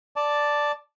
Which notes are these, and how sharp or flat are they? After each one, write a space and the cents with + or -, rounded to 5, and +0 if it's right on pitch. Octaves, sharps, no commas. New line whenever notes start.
D5 +0 A5 +0